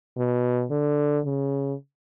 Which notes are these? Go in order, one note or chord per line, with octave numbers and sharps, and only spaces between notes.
B2
D3
C#3